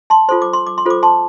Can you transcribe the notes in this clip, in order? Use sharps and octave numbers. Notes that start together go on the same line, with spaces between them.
A5 C6
F4 A4 C5 C6
D6
C6
D6
C6
F4 A4 C5 D6
A5 C6